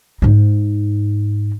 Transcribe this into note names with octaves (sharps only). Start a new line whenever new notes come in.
G#2 D#4